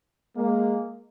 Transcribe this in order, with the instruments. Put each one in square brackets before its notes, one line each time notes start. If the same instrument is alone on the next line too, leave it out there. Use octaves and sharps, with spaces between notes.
[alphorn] G#3 [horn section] A#3